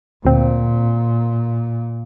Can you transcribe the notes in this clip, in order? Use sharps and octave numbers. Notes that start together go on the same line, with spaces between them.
D2 A#2 C4